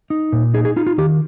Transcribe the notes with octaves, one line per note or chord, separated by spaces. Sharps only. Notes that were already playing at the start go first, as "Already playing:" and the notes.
D#4
A#2
D#4 G#4
G#4
D#4 F4
F4
D#3 G4